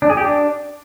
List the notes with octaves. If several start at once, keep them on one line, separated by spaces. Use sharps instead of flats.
D4
G#4
G4
D4